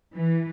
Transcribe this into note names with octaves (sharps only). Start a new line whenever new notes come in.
E3